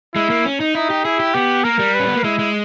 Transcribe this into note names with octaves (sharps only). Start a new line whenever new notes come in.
G#3 E4
A#3
C#4
D#4
D#4 E4
G4
E4 G#4
G4
B3 G4
A#3 A#4
G3
B4
C#4
B3
A#3
G#3 E4
G#3